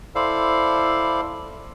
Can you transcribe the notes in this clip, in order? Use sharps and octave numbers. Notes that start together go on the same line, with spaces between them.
E4 A4 C5 D5 F5